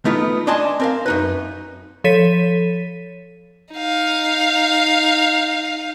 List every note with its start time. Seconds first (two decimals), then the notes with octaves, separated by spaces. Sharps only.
0.05 A3 B3 D#4 F4
0.47 D4 D5 D#5 G#5 A5 C6
0.80 C4 A#4 F5
1.06 F#2 D#4 B4
2.04 F3 A4 C#5 B6 D#7
3.74 D#4 F5